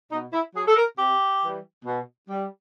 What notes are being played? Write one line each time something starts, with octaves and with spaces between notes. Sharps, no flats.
B2 D#4
E4
F#3 G#4
A4
A#4
C3 G4
E3 G3
B2
G3